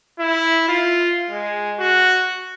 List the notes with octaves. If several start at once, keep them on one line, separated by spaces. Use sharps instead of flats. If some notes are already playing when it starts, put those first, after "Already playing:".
E4
F4
G#3
F#4